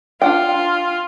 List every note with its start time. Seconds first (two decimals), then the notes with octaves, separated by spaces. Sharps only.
0.22 D4 F4 F#5 G5